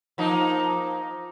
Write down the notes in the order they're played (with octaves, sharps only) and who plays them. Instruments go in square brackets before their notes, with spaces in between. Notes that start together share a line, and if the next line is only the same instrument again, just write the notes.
[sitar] F3 A#3 D#4